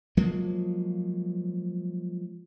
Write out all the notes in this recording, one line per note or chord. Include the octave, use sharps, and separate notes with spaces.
F3 F#3 G#3 A#3